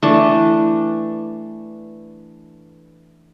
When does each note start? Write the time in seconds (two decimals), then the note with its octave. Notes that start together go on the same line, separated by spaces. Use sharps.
0.03 E3 A3 D4